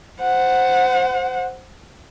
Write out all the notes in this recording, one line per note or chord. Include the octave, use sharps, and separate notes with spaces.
C5 F#5